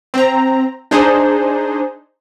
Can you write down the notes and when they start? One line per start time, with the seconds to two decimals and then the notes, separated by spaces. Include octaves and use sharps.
0.14 C4 A#5
0.91 D4 D#4 G#4 C5